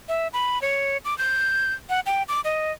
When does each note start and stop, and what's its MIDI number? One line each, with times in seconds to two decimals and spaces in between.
0.09 0.28 76
0.33 0.61 83
0.62 0.97 73
1.05 1.17 86
1.18 1.73 91
1.89 2.00 78
2.06 2.23 79
2.28 2.41 86
2.44 2.72 75